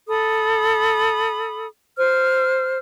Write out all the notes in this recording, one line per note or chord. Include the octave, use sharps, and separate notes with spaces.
A4 B5 D#6
C5 F6